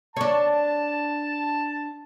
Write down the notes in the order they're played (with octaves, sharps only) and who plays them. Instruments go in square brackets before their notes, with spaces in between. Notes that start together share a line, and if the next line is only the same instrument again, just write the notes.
[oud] D4 C#5 [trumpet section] A5